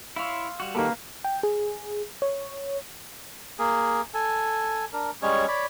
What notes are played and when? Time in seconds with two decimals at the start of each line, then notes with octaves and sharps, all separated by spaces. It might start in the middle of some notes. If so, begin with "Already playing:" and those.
0.16 E4 C#5 F5 C6 E6
0.60 G3 F#4
0.75 D#3 A#3 G4 A4 B4
1.25 G5
1.43 G#4
2.22 C#5
3.59 A#3 G#4
4.14 A4 G#5
4.93 D4 A#4
5.22 G3 G#3 C#4 C#5
5.48 C#5 D5 B5